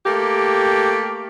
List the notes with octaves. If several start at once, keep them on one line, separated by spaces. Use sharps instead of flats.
A3 A#3 G4